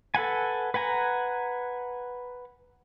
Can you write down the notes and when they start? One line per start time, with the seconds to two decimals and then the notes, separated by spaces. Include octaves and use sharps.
0.15 A4 B4 F#5 G#5
0.74 B4 F#5 G#5 A#5